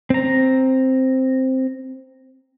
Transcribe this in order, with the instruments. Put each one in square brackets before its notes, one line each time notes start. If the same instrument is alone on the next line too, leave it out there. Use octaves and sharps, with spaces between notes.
[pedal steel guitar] C4 A#5